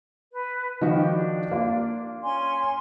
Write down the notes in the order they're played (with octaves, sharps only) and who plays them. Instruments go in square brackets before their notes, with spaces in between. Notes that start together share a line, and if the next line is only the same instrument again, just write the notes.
[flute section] B4
[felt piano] D#3 F3 F#4 [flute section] G4
[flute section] D4
[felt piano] A#3 F4
[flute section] C#4 G#5 C6